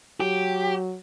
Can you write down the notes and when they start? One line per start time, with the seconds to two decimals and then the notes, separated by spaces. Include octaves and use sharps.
0.20 F#3 G4